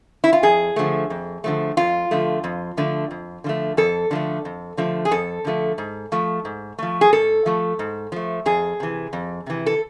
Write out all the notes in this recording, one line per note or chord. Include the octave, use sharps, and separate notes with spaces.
E4
F4
F2 G#4
D3 F3 A3
F2
D3 F3 A3
F2 F4
D3 F3 A3
F2
D3 F3 A3
F2
D3 F3 A3
F2 A4
D3 F3 A3
F2
D3 F3 A3
G#4
F2 A4
D3 F3 A3
G#2
F3 A3
G#2
F3 A3
G#4
G#2 A4
F3 A3
G#2
F3 A3
F2 G#4
C3 E3
F2
C3 E3
A4